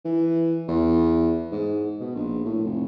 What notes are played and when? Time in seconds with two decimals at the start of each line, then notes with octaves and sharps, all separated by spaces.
0.05 E3
0.68 E2
1.51 G#2
2.00 B2
2.15 A#1
2.44 A2
2.65 F1